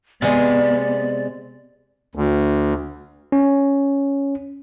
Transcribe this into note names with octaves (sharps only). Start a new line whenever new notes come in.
C3 G#3 B3 D5
D2
C#4